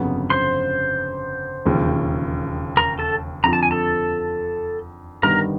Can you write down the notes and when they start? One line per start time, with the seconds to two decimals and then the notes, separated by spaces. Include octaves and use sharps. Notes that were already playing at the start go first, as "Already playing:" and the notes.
Already playing: G1 F2 C#3 F#3 B3
0.30 C5 C6
1.65 E1 D#2 C#3 F3
2.77 A#4 A#5
2.99 A4 A5
3.44 F2 D3 F3 A#5
3.53 A5
3.63 G#5
3.71 A4 A5
5.23 G1 G2 D#3 G3 B3 A#4 A#5